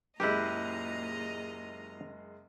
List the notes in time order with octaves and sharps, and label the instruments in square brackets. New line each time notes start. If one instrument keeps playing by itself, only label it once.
[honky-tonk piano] F#1 G#3 F#6 [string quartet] A#2 D#5 A#5 [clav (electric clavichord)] E4 G4